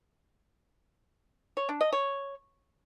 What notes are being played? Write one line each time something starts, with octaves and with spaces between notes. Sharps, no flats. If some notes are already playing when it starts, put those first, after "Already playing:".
C#5
D4
D#5
C#5